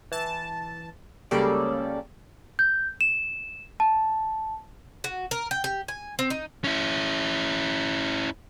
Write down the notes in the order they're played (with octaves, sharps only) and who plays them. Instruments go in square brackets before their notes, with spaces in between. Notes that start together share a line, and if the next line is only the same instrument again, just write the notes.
[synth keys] E3 A5
C#2 C#3 G3 A#3 A4 D5
[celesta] G6
E7
A5
[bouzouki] F#4
A#4
G5
G4
G#5
C4
D#4
[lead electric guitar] C#4 E4